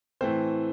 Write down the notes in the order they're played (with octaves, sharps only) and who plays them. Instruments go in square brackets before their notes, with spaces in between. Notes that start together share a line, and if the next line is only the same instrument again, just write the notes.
[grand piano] A2 E3 A3 C4 C5